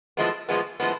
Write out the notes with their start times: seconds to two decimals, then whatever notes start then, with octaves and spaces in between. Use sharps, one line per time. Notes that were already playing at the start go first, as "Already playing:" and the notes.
0.17 A2 F3 G#3 B3
0.49 A2 F3 G#3 B3
0.80 A2 F3 G#3 B3